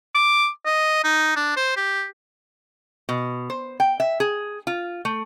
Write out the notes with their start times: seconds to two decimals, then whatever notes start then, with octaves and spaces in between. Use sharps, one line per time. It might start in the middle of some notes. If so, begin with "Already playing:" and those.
0.15 D6
0.66 D#5
1.04 D#4
1.36 D4
1.57 C5
1.76 G4
3.09 B2
3.50 C5
3.80 G5
4.00 E5
4.20 G#4
4.67 F4
5.05 A3